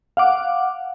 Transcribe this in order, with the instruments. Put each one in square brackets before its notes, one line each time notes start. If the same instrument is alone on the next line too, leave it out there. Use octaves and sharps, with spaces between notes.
[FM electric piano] F5 F#5 D6